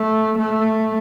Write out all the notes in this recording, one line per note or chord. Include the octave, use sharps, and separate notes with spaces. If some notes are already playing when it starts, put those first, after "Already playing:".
Already playing: A3
A3